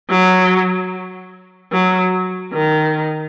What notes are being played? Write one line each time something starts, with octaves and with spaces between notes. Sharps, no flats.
F#3
F#3
D#3